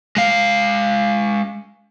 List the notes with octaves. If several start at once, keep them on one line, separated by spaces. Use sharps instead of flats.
G#3 F5